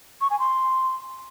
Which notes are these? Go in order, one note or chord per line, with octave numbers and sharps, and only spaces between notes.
C#6
G#5
C6